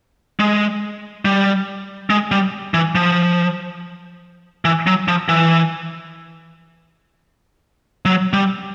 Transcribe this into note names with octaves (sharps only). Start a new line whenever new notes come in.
G#3
G3
G#3
G3
E3
F3
E3
F#3
F3
E3
F#3
G3